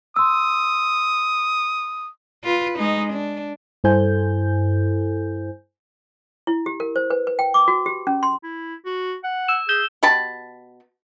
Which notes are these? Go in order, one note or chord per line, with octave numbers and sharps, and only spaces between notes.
C6 D#6 E6
F4 B4
G#3 D#4
D4
G2 E4 A4 C5 G#5 G6
E4
G4
A#4
C5
B4
B4
G5
D6
F#4
G4
C#4
C6
E4
F#4
F#5
E6 E7
G#4 G6 E7 G7
B2 G4 A5 B5